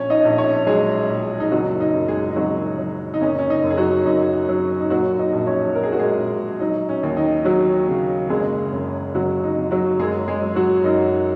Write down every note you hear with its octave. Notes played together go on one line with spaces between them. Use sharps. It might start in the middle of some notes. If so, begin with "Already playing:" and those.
Already playing: A#1 C#4 C#5
D#4 D#5
A#1
C#4 C#5
F#3 G#3 G#4
A#1
D#4
F#1 F#3 F#4
D#4
F#2
G#3 G#4
D#4
F#1 F#3 F#4
F#3
D#4
F#1 C#4
C#4
D#4
F#2
G#4
F#3 F#4
F#2 D#4
F#3
D#4
A#2 F#3 F#4
D#4 D#5
A#1
C#4 C#5
F#3 A#4
G#4
F#4
G#3 G#4
A#1
F#3 D#4
C#4
D#2
D#4
F#3 F#4
C#3
F#1 G#3 G#4
F#2
F#1 F#3 F#4
D#4
F#1
F#3 F#4
F#2 G#3 G#4
G#3 G#4
F#3
F#3 F#4
F#2 D#4